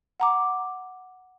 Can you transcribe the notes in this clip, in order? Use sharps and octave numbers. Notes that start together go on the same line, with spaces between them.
F#5 A#5 D6